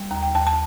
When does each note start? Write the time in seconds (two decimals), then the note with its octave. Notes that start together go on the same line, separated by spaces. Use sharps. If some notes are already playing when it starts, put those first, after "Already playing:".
Already playing: G3
0.11 D#2 A#5
0.22 G5
0.35 D#2 A5
0.47 A5